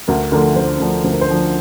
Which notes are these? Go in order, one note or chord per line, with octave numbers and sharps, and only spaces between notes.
D2 A#4
D3 F3 A3 A#4
D2 C5
D3 F3 A3
D2 C5
A#4
C5
D3 F3 A3